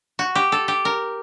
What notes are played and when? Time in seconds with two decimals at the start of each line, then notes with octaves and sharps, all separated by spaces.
0.19 F#4
0.35 G4
0.52 A4
0.68 G4
0.85 A#4